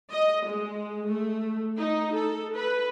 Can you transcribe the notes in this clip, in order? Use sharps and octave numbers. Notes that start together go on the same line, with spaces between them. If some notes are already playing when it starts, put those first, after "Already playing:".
D#5
G#3
A3
D#4
A4
B4